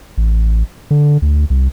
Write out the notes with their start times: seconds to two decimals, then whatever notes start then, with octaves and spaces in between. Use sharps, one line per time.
0.18 A1
0.91 D3
1.22 D2
1.50 C2